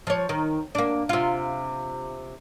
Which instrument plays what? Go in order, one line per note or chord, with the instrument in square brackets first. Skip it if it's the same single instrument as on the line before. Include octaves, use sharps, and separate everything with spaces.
[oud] F3 C#5
D#3
A#3 D4
C3 F4